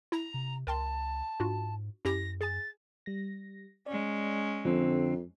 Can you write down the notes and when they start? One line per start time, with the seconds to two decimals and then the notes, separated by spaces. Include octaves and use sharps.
0.12 E4 A#5
0.34 C3
0.67 C#2 A#4 G5 A5 C6
1.40 G#2 D4 F4 F#4
2.05 F#2 C#4 E4 G4 A#6
2.41 G#4 G#5 A6
3.06 G3 A#6
3.86 G#3 C#4 D5
4.65 F2 D3 F3 C4